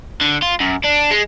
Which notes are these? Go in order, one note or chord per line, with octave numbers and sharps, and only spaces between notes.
D3
F4
F#2
D4
G#3